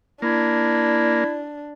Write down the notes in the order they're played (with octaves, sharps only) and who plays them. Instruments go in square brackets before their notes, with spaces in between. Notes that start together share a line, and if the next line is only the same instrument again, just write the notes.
[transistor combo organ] A#3 [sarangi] D4 [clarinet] E4